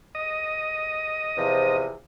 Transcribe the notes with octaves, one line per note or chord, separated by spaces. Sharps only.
D#5
E2 C3 F3